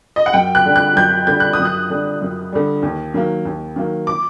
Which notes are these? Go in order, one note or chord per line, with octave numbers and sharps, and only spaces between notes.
D#5
F#5
F#2 G5
F#6
D3 G3
F#6
F#2 G6
D3 G3 G6
F#6
D#6
F#2
F#6
D3 G3
F#2
D3 G3
D#2
D#3 F#3 A#3
D#2
D#3 F#3 A#3
D6